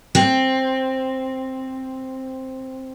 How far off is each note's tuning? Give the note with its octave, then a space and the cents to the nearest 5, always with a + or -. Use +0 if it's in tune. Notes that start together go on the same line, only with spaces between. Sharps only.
C4 +5